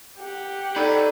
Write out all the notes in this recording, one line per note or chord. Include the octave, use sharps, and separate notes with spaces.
G4 F#5
D#4 A4 C5 D5 B5 G6